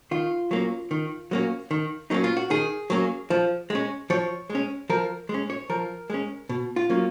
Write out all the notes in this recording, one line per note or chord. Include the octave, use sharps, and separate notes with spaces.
D#3 F4
F#3 A#3 C#4
D#3
F#3 A#3 C#4
D#3
F#3 A#3 C#4 D#4
F4
F#4
D#3 G#4
F#3 A#3 C#4
F3
G#3 C#4
F3 C#5
G#3
C#4
F3 A#4
G#3 C#4
C#5
F3 A#4
G#3 C#4
B2
F4
F#3 A#3 C#4